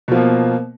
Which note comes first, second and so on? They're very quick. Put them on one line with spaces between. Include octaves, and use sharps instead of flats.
B2 F3 A#3